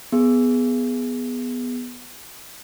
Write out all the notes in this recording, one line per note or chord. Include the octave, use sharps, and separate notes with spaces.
B3 G#4